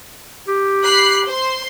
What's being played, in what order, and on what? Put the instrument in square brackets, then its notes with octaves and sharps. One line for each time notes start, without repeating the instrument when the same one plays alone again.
[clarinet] G4
[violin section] B5 F#6 C7
C5 C6